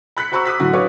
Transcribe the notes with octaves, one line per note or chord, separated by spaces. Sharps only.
B5 F#6 B6 C#7
F#4 C5 A#5 B5 C#6 E6
D6 D#6 F#6 B6
A2 D3 F#3 F#4
B4 C#5 F5 C#6 D6